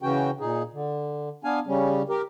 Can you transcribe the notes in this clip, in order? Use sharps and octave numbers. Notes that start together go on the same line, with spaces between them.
C#3 E3 C#4 F#4 G5
A#2 D#4 G#4
D3
B3 D4 F5 G#5
C#3 G3 C#4
G4 A#4